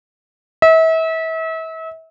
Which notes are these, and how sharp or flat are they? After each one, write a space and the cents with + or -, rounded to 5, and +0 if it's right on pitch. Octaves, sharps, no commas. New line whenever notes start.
E5 -35